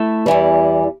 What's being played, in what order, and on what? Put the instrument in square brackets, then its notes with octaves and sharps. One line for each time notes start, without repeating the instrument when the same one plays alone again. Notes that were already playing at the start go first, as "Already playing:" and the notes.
Already playing: [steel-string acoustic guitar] A3 E4 A4
E2 E3 G3